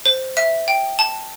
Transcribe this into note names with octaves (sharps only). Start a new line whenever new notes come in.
C5
E5
G5
A5